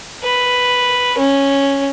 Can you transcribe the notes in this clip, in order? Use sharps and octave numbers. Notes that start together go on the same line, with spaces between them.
B4
C#4